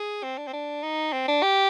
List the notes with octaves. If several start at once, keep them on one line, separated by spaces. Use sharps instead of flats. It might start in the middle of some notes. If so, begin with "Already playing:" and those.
Already playing: G#4
C4
D4
C4
D4
D#4
C4
D4
G4